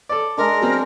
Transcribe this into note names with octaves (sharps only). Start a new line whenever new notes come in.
A4 D5
G#3 D4 A#4
F#3 C4